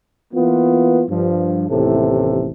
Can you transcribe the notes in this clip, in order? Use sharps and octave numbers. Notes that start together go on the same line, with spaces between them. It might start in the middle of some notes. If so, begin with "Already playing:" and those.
E3 A#3 B3 F4
G2 F3
A1 D#2 A2 C3 E3 A4